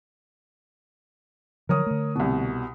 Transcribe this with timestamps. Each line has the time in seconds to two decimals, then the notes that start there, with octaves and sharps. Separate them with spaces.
1.69 D3 F3 F#3 A#4 C#5 D#6
1.86 D3 A3
2.15 C2 B2